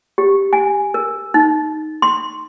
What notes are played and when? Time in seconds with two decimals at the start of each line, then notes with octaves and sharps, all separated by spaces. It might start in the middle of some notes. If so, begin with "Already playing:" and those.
0.18 G4
0.53 G#5
0.94 A#4
1.34 D#4
2.02 C6